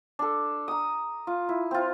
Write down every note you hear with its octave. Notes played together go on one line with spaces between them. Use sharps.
D4 A4
A#5 D#6
F4
E4
C4 F4